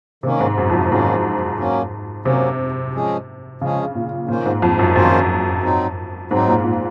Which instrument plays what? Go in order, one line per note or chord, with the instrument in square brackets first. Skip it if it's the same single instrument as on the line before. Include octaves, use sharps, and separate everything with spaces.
[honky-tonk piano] C3 [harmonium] D#3 A#3 C#4
[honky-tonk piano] G#2
F#2
F2
F#2
[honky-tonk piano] G#2 [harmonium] D#3 A#3 C#4
[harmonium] F#3 A#3 C#4
[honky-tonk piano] C3 [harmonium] F#3 A#3 C#4
[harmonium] F3 G#3 C#4 G#4
[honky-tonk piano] C#3 [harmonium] F3 G#3 C#4 G#4
[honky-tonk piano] A#2
[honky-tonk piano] A#2 [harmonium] D#3 A#3 C#4 F4 C5
[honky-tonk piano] G#2
F2
F#2
[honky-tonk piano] F#2 [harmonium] D#3 A#3 C#4 F4 C5
[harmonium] F#3 C4 D#4
[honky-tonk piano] G#2 [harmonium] F#3 C4 D#4
[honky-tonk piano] A#2
A#2